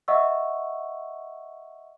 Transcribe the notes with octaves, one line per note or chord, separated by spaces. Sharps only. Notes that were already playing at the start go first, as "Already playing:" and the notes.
D#5 E5 F#5 C#6 E6